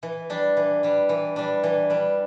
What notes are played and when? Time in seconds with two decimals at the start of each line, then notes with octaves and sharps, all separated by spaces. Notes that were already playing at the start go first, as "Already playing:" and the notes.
0.03 E3
0.30 G3 D4
0.57 E3
0.83 G3 D4
1.09 E3
1.36 G3 D4
1.63 E3
1.90 G3 D4